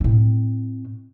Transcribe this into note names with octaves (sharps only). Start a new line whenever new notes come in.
A2 C4